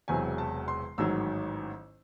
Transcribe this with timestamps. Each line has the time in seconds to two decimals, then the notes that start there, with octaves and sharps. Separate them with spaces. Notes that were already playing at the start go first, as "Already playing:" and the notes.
0.08 E1 E2 C3 F#3 G#5
0.38 A5
0.68 C6
0.98 A1 G#2 D#3 F#3 E6